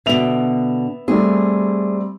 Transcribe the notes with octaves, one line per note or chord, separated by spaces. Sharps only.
B2 D3 B3 E5 F7
G3 A3 C4 G#4